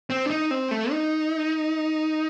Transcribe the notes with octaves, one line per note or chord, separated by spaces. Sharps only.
C4
D4
D#4
C4
A3
D#4